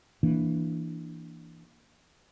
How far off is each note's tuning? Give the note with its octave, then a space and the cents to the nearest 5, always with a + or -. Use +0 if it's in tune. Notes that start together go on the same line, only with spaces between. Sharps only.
E3 +0 A#3 +0 D4 +0